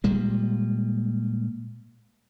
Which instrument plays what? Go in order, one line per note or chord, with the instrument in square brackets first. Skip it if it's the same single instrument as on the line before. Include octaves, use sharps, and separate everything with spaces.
[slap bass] A#2 G3 G#3